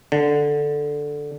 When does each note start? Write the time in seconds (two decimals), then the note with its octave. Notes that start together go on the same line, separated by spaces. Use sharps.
0.12 D3